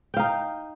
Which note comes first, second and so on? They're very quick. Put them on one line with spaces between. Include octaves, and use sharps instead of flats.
G5 F5 D#4